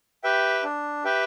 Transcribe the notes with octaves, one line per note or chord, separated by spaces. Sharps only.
G4 B4 E5 G5
D4
G4 B4 E5 G5